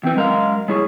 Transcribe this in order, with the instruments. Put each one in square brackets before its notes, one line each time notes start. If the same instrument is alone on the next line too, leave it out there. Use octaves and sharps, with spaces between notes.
[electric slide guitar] E2 E3 [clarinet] C4
[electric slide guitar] F#2 A#4 F5 [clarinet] G#3
[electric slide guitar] G#3 E4 G#4 [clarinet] C#5